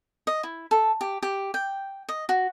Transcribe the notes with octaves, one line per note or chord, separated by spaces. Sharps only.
D#5
E4
A4
G4
G4
G5
D#5
F#4